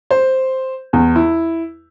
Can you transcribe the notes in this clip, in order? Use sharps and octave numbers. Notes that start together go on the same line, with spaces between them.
C5
E2
E4